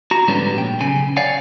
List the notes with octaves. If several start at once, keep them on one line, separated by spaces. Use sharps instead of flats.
F#4 A#5
G#2 D3 F3 G3 B3 C#4
A#2 G5
B1 C#3 G#5
C#5 D5 F5 F#5 G#5